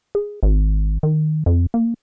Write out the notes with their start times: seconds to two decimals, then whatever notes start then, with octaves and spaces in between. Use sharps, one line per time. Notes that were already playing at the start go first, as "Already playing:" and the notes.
0.15 G#4
0.43 G#1
1.03 D#3
1.46 F2
1.74 A#3